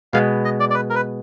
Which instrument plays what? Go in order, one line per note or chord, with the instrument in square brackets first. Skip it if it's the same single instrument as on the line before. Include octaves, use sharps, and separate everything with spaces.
[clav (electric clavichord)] B2 G#3 B3 [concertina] F5
[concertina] D#5
D5
D5
B4
A#4
B4